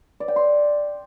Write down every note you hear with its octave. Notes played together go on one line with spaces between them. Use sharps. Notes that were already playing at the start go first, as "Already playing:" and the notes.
D5
G5
C6